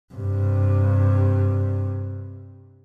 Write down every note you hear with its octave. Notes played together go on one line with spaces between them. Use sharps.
G2 C3